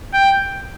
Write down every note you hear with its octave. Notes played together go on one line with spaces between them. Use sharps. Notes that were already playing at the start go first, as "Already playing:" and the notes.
G5